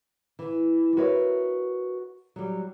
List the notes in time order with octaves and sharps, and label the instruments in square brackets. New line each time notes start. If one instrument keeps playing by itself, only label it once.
[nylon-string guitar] E3
F#4 A#4 B4 C#5 E5
F#3 G3